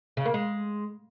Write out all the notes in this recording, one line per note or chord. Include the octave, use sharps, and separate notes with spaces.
C#3
A#3
G#3